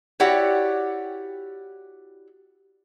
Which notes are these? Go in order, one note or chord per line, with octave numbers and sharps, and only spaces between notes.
E4 F#4 G4 C#5 D5 F#5